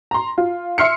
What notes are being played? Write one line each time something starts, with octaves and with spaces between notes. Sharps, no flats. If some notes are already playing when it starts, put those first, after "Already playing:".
A#5 C6
F4
E5 C6 F6 C7 C#7